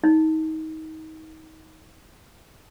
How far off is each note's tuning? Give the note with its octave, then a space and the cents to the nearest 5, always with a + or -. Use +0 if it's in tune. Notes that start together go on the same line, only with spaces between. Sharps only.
D#4 +30